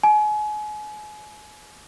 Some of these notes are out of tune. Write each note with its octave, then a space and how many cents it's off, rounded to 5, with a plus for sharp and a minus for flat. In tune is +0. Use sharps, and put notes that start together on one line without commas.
G#5 +35